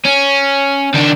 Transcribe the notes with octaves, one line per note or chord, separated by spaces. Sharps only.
C#4
D#3 D4